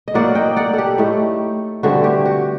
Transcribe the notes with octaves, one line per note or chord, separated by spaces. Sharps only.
D#5
A2 F#3 A#3 D#4 D5 F#5
D#5 G5
D5 F#5
G4 A4
A2 A3 D#4
G2 D3 A3 C4 F#4
G4
F#4